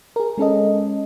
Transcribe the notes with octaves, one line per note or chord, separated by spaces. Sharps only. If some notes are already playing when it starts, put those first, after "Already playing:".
G#4 A#4
G#3 C#4 A4 D#5